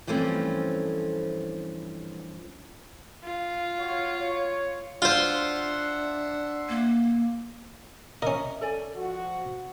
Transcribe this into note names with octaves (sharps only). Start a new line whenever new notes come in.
G2 E3 F3 A3 C4 C#4
F4
F#4 C#5 F5
C#5
D4 F4 C5 E5 F#5 C6
A#3
C#4 A#4 D#5 E5
A4 D5 G#5
F3 F#4